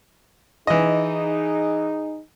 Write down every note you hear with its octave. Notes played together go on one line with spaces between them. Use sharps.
E3 D#4 G#4 D#5